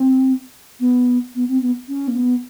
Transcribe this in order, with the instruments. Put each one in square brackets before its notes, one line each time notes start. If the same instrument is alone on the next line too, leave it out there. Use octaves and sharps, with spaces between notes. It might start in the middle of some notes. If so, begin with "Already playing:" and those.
Already playing: [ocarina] C4
B3
B3
C4
B3
C#4
A#3
B3